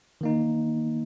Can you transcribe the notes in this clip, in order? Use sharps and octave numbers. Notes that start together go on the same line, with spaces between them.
D#3 A#3 D#4